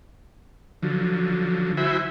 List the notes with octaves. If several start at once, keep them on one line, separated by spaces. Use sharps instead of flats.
D3 F3 F#3
E4 F#4 C5 E5 G#5 B5